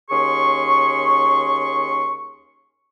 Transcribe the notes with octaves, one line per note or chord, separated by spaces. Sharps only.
D#2 C#4 G#4 C6 C#6